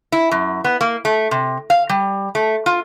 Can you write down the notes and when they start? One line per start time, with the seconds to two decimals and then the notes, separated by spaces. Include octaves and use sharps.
0.12 E4
0.31 F#2
0.64 B3
0.81 A#3
1.05 A3
1.31 C3
1.70 F5
1.89 G3
2.35 A3
2.66 F4